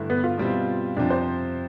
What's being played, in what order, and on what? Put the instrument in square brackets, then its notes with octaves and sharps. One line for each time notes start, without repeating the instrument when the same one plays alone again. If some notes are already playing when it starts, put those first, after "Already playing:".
Already playing: [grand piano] G2 D3 A3 E4
[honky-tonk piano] B3
F4
[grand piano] B2 G3 C4 E4
[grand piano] F2 C3 F3 [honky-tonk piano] D4
[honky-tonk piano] C5